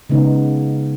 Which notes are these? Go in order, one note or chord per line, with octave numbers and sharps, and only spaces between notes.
C#3 G#3 B3 D#4